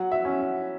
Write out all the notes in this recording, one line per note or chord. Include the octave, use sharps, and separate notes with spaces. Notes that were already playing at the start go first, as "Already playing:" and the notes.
Already playing: F#3 F#5
E5
C#4
F#5